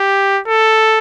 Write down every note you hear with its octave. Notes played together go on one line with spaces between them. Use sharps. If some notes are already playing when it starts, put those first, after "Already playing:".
Already playing: G4
A4